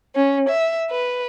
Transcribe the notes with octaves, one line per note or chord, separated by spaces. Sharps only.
C#4
E5
B4